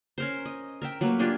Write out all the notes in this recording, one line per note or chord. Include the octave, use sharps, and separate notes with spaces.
C#4 A#4 C5
D#5
A#4 E5 G5
F#3 A3 A#3 B4
D4 F4 G4 G#5